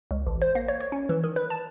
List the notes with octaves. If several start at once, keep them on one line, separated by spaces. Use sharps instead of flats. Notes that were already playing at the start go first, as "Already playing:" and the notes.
C#2
A1
C5
A#3
C#5
C#5
C#4
E3
D#3
B4
A5